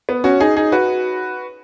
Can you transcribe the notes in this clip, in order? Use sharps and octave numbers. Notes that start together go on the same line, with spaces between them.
B3
C#4 F#4
D#4 G#4
D#4 G#4
F#4 B4